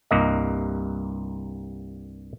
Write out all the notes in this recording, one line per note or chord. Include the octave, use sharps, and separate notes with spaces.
C2 G2 A#3 D#5